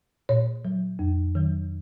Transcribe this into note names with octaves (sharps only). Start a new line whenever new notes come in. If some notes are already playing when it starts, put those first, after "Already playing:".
A#2 C#5
F#3
F2
D#3 F#3